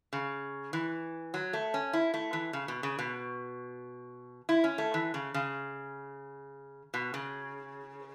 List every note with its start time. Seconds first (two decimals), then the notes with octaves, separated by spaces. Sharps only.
0.13 C#3
0.73 E3
1.34 F#3
1.53 A3
1.74 C#4
1.93 E4
2.14 A3
2.33 E3
2.53 C#3
2.68 B2
2.83 C#3
2.99 B2
4.49 E4
4.64 C#4
4.78 A3
4.94 E3
5.14 C#3
5.34 C#3
6.94 B2
7.14 C#3